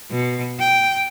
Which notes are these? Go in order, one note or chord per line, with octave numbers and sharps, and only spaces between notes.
B2
G5